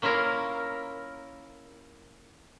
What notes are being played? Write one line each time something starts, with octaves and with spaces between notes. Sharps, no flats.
A#3 C#4 E4 F4 A#4